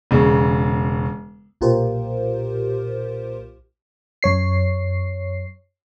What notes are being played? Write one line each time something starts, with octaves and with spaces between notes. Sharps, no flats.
E1 C#3
B1 A#2 F4 G4 A#4 C5
F#2 C#5 C7